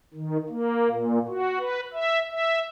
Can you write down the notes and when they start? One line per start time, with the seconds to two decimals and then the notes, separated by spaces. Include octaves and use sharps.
0.14 D#3
0.49 A#3
0.90 A#2
1.28 F#4
1.58 B4
1.93 E5
2.31 E5